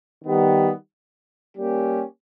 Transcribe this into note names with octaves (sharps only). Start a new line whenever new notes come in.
D#3 G3 B3 G4
G3 A#3 C#4 G4